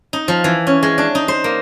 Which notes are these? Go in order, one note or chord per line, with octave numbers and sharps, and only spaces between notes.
D#4
F3
E3
C#4
G#3
D4
D#4
C5
A#3